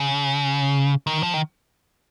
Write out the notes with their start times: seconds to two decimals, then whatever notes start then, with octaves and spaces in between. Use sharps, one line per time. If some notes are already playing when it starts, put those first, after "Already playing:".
Already playing: C#3
1.07 D#3
1.23 F3
1.34 D#3